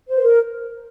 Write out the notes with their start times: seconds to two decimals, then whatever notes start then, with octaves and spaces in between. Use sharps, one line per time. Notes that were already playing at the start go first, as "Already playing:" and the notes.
0.08 C5
0.16 B4
0.23 A#4